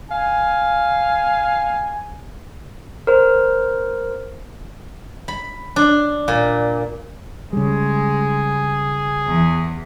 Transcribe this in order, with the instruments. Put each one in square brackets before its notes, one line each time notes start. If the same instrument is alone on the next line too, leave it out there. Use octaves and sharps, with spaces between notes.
[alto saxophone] F5 [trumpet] G#5
[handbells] A#4 C5
[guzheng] B5
D4
A#2
[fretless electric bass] C#3 G3 [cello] G#3 [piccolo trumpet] G#4
[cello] E2 E3